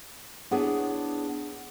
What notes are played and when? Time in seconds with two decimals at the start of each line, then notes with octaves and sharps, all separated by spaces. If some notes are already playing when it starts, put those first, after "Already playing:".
0.51 B3 D4 E4 G#4 C#5